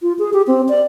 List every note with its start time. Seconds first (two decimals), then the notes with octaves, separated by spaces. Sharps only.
0.02 F4
0.19 G#4
0.33 G4
0.47 C4
0.69 D5